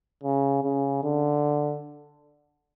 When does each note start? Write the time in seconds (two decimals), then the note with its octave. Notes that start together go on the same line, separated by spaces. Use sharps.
0.24 C#3
0.64 C#3
1.03 D3